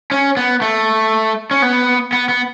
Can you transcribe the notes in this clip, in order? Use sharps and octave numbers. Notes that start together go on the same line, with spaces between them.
C#4
B3
A3
C#4
B3
B3
B3